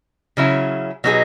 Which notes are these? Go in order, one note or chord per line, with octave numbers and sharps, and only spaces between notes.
C#3 F#3 C#4 E4
B2 F#3 B3 D#4 G#4